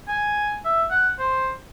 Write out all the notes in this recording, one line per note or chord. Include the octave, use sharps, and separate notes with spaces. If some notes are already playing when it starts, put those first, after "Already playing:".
G#5
E5
F#5
C5